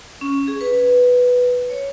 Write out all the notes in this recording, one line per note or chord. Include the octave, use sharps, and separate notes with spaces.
C#4
G#4
B4
C#5